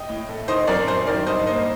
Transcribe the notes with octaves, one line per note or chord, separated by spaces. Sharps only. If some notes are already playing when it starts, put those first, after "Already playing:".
Already playing: D#5 G5
A2
A3
D#3 C5 D#5
F#2 A#4 D5
F#2 C5
D#3 A#4 D5
G2 C5 D#5
A#3 C5 D#5